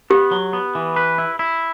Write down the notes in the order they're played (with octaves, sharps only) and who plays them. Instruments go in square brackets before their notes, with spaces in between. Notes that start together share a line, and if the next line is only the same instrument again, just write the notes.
[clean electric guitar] B3 [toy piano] G4
[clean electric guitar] F#3
B3
E3
B4
E4
E4